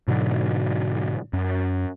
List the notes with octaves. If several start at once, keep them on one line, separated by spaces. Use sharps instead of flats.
G#2 B2 D3 F#3
F#2